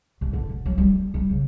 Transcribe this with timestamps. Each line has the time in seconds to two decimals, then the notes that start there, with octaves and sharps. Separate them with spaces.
0.21 G2
0.33 D3
0.50 E1
0.66 F#3
0.78 G3
0.93 A#3
1.14 G3
1.30 C#3